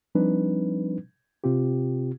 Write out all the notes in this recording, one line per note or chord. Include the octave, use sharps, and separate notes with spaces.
F3 G3 C4 D4 D#4 B4
C3 C4 F4 G4